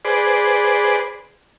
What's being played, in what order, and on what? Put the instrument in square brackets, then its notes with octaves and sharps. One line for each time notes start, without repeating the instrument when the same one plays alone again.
[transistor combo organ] G#4 B4 C5 D5